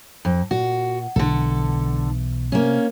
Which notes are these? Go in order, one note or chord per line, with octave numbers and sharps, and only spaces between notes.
F2
A#2 F#4
B1 D3 E3 A4
C3 A#3 C#4